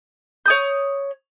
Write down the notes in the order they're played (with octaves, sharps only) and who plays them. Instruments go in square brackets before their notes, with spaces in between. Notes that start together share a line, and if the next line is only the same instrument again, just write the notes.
[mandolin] C#5 D#6 G6